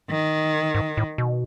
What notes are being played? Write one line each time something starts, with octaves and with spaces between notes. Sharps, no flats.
D#3
G#2
A2
B2